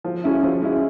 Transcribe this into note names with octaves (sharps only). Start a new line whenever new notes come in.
F3
G#3 C#4 E4
F3
G#3 C#4 E4